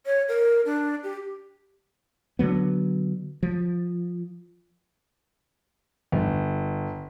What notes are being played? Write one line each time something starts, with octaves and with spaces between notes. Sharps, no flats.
C#5
A#4
D4
G4
D3 D#3 F#3 B3
F3
G1